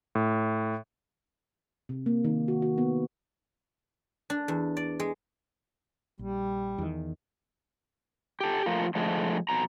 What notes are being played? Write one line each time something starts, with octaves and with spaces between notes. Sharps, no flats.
A2
C3
A#3
D#3
F#4
F#4
B3
D4
E2
D5
G#3
A#1 G3
E2 D#3
G4 A4
F3 A3 F4 A#4
D3 F3 G#3 A3
F2 B2 A#5